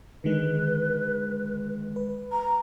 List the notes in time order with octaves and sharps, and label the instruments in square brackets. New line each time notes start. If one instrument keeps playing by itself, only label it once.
[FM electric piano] D3 D#3 G#3 [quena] B4
[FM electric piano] B4
[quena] A#5